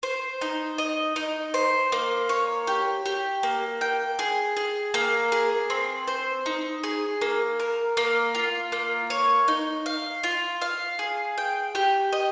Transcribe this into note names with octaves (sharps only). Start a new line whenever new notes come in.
C5
D#4
D#5
D#4
C5
A#3
C#5
G4
G4
A#3
G5
G#4
G#4
A#3
G#4
C4
C5
D#4
G#4
A#3
A#4
A#3
F4
A#3
C#5
D#4
F5
F4
F5
G#4
G5
G4
D#5